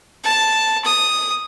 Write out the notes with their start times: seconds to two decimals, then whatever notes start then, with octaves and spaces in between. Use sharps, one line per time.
0.24 A5
0.85 D#6